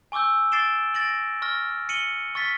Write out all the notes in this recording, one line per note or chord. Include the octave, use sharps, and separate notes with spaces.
G#5 C#6 D6 E6 G6
D6 A6 C7 D7 E7 G7
A6 A#6 D7 F#7
C#6 F6 A#6
C#7 D#7 F#7 G7
C#6 F6 A6 B6